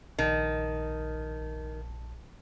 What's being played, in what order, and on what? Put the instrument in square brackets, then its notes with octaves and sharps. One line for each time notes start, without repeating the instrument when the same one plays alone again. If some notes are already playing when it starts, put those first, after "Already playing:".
[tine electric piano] A#1 A5 [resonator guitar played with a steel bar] D#3